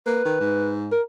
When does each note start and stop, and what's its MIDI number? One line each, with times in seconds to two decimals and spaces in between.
0.06 0.22 58
0.06 0.74 71
0.25 0.36 51
0.40 0.94 44
0.92 1.02 70